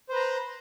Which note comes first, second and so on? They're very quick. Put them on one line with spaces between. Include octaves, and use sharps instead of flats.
C5 B4 A#5 C6